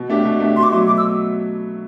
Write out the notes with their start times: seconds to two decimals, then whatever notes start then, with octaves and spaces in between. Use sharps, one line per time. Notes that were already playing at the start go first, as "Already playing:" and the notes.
Already playing: B2
0.09 A3 D4 G4
0.25 B2
0.40 A3 D4 G4
0.56 B2 C6
0.63 D6
0.71 F#3 A3 E4 C6
0.87 B2 D6
0.97 E6